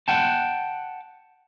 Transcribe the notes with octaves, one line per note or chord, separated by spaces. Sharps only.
F#5 G5 A5